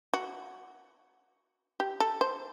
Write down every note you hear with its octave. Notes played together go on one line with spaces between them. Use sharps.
F#4
G4
A4
C5